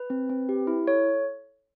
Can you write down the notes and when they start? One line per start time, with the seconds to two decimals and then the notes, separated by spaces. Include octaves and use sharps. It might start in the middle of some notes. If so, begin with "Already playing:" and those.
Already playing: B4
0.10 C4
0.29 C4
0.49 G4
0.67 E4
0.87 A4 C#5